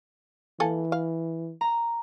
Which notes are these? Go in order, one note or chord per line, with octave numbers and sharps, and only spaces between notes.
E3 A#3 A4 G#5
F5
A#5